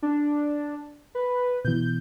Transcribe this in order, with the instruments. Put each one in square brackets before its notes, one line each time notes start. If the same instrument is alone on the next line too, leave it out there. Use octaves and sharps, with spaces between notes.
[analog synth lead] D4
B4
[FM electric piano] B2 E3 [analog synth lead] G6